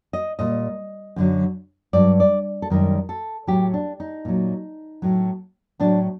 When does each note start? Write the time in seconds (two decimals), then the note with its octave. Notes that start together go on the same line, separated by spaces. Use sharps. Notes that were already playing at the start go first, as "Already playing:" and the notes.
0.13 D#5
0.39 A#2 G3 D#5
1.16 F#2 D3 F#3
1.93 G2 F#3 D5
2.20 D5
2.62 A4
2.70 F#2 D#3 G3 A#4
3.09 A4
3.47 A2 F#3 G4
3.74 D4
4.00 D#4
4.25 A#2 F#3
5.02 A2 F#3
5.80 A2 F#3 D4